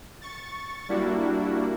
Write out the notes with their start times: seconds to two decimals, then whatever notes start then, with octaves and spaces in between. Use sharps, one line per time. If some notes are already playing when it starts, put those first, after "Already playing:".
0.22 C#6 A6
0.89 G3 A#3 D4 E4 F#4